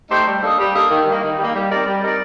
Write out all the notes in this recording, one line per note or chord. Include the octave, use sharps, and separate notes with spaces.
A3 D#4 G4 C5
G3
A#3 D4 A4 D#5
G3
A#3 D4 A4 D#5
D#3
G3 A#3
D#3
G3 A#3
G3
C4 D#4 A#4 D5
G3
C4 D#4 A#4 D5